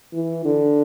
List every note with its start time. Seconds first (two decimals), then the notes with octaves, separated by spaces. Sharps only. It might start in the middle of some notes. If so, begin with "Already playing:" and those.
0.13 E3
0.46 D3